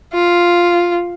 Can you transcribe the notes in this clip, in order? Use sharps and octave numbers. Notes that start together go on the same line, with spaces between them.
F4